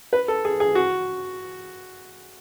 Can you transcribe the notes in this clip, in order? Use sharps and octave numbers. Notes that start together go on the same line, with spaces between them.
B4
A4
G#4
G#4
F#4